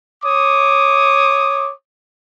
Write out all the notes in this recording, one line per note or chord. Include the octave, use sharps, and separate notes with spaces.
C#5 D6 D#6